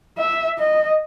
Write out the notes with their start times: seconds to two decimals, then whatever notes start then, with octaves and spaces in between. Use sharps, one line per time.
0.18 E5
0.58 D#5